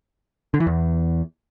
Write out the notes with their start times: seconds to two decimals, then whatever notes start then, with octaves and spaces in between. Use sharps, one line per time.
0.54 D3
0.60 E3
0.67 E2